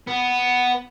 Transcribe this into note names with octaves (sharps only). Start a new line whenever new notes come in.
B3